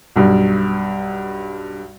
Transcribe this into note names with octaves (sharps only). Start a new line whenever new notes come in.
B1 G2